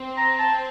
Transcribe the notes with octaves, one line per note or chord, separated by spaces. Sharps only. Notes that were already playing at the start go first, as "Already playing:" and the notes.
Already playing: C4
A#5
A5